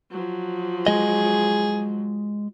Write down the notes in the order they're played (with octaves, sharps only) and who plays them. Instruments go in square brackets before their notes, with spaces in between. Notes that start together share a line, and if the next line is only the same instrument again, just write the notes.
[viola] F3 F#3
[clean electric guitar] G#3 D#5 [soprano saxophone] G#4